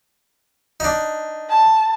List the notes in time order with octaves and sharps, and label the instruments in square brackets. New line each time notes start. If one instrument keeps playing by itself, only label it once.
[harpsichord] D4 D#4
[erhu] A5